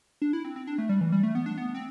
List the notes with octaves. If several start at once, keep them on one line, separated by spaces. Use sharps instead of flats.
D4
E4
C4
C4
D4
A3
G3
E3
G3
A3
B3
D4
B3
C4